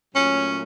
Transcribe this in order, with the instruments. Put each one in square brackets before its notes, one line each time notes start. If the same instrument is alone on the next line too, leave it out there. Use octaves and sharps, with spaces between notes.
[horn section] A#2 F#3 A3 C#4